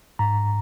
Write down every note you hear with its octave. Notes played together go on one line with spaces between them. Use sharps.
G#2 A#5